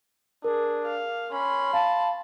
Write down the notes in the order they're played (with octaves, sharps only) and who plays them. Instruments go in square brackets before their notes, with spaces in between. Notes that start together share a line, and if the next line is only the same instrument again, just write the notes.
[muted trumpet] D4 [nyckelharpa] G#4 [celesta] A#4
[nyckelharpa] F5
[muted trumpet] C#4 [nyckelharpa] B5 C6
[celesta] F5 [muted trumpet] A5